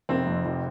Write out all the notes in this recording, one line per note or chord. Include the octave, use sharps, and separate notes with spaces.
F1 C4
F2
F1